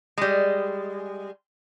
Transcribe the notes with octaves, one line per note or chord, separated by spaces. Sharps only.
G3 G#3